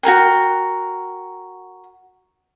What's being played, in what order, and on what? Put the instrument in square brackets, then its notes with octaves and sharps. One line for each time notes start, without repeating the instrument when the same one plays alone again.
[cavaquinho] F#4 G#4 A#4 G5